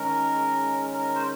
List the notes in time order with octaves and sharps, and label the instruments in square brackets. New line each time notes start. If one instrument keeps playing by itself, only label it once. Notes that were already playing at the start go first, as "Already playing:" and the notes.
Already playing: [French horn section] D#3 G#3 C#4 [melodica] A#4
[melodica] A#4
C5